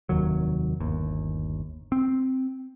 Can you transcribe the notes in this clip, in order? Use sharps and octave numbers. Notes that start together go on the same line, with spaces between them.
F1 D#2 D#3 F#3
G1 D#2
C4